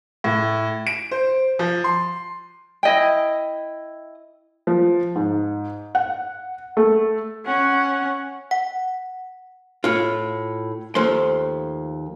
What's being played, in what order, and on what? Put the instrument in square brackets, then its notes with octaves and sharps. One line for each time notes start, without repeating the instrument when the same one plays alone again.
[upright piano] A2
D7
C5
F3
C6
[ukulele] E4 D#5 G5
[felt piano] F3
G#2
F#5
A3
[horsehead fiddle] C#4 F#5
[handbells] F#5
[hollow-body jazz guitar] A2 F4
D#2 F3 A3 C6